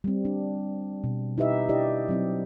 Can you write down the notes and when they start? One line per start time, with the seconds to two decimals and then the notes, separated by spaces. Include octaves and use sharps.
0.04 G3 C4
0.25 D4
1.04 B2
1.38 D#4 E4 G4 B4 D#5 E5
1.69 D4 E4 G4 D5 D#5
2.08 F#3 C4 E4